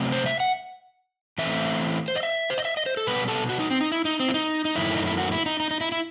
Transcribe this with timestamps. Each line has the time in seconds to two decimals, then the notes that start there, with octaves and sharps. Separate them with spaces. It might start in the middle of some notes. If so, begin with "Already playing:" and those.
Already playing: C3 F#3 A3 C4
0.12 C5
0.26 E5
0.40 F#5
1.38 A2 E3 A3 C4 E5
2.08 C5
2.16 D#5
2.23 E5
2.50 C5
2.58 D#5
2.65 E5
2.77 D#5
2.86 C5
2.97 A4
3.07 B2 G3 B3 B4
3.28 A4
3.49 F#4
3.59 D#4
3.70 C4
3.81 D#4
3.92 E4
4.05 D#4
4.20 C4
4.29 E4
4.34 D#4
4.65 D#4
4.75 F#2 D#3 A3 E4
4.94 D#4
5.06 E4
5.18 F#4
5.32 E4
5.46 D#4
5.60 D#4
5.71 D#4
5.81 E4
5.92 E4